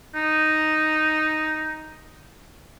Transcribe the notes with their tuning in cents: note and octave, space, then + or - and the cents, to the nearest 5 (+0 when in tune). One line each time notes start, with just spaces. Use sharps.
D#4 +0